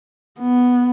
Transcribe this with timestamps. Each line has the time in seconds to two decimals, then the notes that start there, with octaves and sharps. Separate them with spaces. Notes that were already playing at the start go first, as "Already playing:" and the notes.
0.40 B3